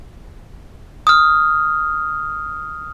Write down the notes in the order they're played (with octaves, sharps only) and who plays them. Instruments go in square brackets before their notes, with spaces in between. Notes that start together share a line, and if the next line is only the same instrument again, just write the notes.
[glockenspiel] D#6 F6